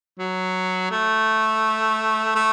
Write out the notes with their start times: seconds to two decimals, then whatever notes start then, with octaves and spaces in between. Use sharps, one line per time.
0.19 F#3
0.91 A3
2.35 A3